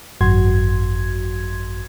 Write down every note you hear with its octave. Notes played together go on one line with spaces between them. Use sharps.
G#1 F#2 F#4 C6 G#6